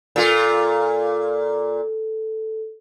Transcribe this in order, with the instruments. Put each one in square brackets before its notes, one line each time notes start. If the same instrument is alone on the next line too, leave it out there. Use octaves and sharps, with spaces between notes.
[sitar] A#2 F4 [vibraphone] A4